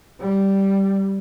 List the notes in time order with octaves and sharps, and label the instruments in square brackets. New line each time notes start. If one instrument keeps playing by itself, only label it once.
[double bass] G3